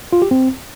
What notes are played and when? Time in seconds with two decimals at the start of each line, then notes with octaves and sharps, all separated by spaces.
0.13 F4
0.22 G4
0.31 C4